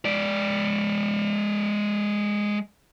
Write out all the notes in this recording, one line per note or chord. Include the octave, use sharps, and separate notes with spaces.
G#3 D5